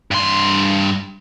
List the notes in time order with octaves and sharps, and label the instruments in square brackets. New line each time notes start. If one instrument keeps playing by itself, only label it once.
[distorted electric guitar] G2 C6